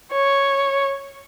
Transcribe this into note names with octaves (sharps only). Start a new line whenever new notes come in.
C#5